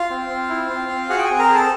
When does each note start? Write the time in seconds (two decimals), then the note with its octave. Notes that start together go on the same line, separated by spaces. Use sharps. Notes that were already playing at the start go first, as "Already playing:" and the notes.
Already playing: F4 F5
0.10 C4
0.29 C4
0.49 E4
0.70 C4
0.89 C4
1.09 F#4 G#4 F#5
1.18 G5
1.24 G#4 G#5
1.30 C4
1.39 A#4 A#5
1.49 G#4
1.55 A4 A5